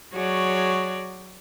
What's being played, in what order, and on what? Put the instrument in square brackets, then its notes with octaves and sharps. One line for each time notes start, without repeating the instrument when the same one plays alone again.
[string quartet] F#3 F#4 G#4 C#5 D5